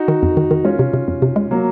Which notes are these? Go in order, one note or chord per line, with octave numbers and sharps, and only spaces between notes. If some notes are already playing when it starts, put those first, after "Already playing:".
Already playing: D#4 F#4
D#3
F2
D#3
D#3
G#3 C#4 F4
C3
C3
F2
C3
G#3
F#3 A#3